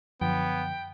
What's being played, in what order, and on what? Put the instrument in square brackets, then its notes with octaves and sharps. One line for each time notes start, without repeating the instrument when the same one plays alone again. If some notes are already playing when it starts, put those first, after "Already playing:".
[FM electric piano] F#2 D3 F3 [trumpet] B3 [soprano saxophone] G5